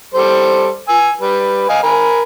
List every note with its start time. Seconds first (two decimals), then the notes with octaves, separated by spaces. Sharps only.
0.14 G3 A4 C5
0.89 G#5 E6
1.21 G3 B4
1.69 D#5 F5 G#5
1.83 A#4 G#5 B5